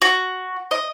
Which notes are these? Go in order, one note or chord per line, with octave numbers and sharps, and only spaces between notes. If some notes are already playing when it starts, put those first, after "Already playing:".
F#4
D#5